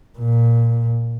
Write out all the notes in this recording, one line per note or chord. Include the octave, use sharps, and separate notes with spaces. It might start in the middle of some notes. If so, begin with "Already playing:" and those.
A#2